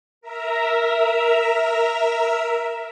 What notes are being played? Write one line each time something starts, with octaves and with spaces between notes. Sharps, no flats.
A#4 E5 A#5